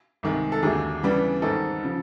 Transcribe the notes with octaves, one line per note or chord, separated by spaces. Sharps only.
C2 C3 D#3 G#3
A4
D#2 D3 F#3 A3 G#4
C#3 E3 G3 B3 D4
G#2 D#3 G3 C4 D#4 A4
C#3 F3